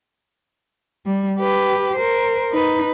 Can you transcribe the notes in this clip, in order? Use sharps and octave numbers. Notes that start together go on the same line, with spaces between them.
G3
G4 B4
A#4 C5
D#4 B4